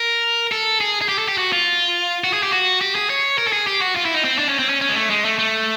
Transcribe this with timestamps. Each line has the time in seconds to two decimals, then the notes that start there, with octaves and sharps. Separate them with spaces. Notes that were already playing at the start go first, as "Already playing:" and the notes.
Already playing: A#4
0.52 A4
0.81 G#4
1.02 G#4
1.09 G4
1.19 A4
1.28 G4
1.38 F#4
1.52 F4
2.24 F#4
2.33 G#4
2.43 G4
2.53 F#4
2.81 G4
2.95 G#4
3.10 C#5
3.38 A#4
3.47 A4
3.53 G#4
3.67 G4
3.82 F#4
3.96 F4
4.06 E4
4.14 D#4
4.25 C4
4.39 D4
4.49 C#4
4.59 C4
4.69 C#4
4.81 C#4
4.89 G#3
4.96 A3
5.10 G#3
5.25 A3
5.39 A3